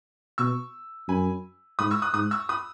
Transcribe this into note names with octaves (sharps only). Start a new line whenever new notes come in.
B2 C#6 E6
F#2 G#5 B5
G#2 B5 D#6
C#6 E6
D#6 F#6
G#2 D#6 F#6
C#6 E6
B5 D#6